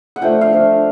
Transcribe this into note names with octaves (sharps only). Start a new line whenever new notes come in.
F#5
F3 A3 D4 F4 G5
F5
F3 A3 D4 F4